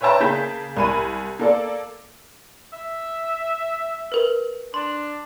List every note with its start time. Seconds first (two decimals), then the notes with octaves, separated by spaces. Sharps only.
0.01 B4 C#5 E5 G5 A5 A#5
0.20 C#3 A#3 G#4 A5 G6 B6
0.77 C2 A#4 G#5 B5 D#7
1.39 A#3 A4 D5
2.73 E5
4.12 A#4 B4
4.74 D4 C6